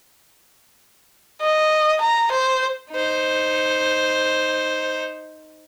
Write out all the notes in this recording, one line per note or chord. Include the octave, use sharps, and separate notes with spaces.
D#5
A#5
C5
D#4 C5